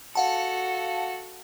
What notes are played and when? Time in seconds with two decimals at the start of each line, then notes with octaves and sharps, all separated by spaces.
0.15 F#4 A4 F5 F#5 A5